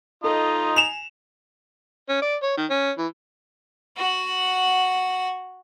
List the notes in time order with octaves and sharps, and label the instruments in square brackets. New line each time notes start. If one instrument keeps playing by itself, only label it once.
[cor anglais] D#4 [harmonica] F4 D#5 [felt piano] A4
[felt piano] G#5 [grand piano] E7 F7
[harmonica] C#4
D5
C#5
D#3
C#4
E3
[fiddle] F#4 F#5